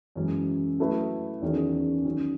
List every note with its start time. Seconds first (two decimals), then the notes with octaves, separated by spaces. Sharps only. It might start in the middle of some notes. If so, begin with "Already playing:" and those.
0.16 F#2 E3 G#3 C#4
0.79 F#3 A3 E4 B4
1.42 E2 D#3 F#3 C#4 G#4
2.05 D#3 F#3 C#4